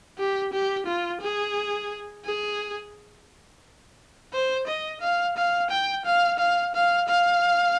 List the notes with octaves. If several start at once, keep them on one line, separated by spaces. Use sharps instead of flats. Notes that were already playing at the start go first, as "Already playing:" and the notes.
G4
G4
F4
G#4
G#4
C5
D#5
F5
F5
G5
F5
F5
F5
F5